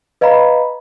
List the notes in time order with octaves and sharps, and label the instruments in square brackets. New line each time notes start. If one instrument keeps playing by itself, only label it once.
[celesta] B4 D#5 F5 A#5 B5